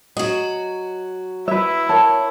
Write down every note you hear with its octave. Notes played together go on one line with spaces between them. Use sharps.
F#3 F#4 D#5
E4 B4 E5
A#4 C#5 A5